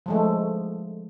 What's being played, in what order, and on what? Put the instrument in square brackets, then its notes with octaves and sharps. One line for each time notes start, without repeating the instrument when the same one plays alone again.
[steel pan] F3 G#3 A3